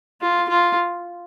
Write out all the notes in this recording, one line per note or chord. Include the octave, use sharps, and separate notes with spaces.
F4
F4